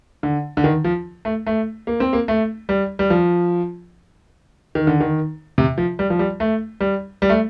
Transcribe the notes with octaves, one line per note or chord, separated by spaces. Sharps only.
D3
D3
D#3
F3
A3
A3
A#3
C4
A#3
A3
G3
G3
F3
D#3
D3
D#3
C3
F3
G3
F3
G3
A3
G3
G3
A3